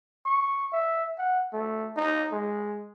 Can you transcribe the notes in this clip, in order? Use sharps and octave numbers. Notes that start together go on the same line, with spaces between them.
C#6
E5
F#5
A3
D#4
G#3